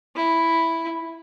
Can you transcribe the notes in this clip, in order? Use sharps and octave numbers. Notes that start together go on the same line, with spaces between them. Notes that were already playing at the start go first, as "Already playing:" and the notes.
E4